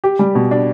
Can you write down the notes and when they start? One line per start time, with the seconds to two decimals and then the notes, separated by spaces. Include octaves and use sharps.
0.04 G4
0.19 G3
0.35 B2
0.51 D4